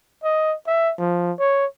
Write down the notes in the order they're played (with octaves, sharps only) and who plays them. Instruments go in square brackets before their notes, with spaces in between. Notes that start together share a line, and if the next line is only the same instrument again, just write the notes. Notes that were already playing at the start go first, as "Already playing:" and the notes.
[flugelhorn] D#5
E5
F3
C#5